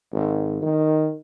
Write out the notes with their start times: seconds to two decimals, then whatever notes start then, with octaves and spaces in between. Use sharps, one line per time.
0.13 G#1
0.62 D#3